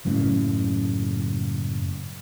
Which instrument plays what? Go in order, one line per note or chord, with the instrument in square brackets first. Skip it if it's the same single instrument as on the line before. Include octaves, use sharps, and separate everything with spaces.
[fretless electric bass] F#1 F#2 A2 C#3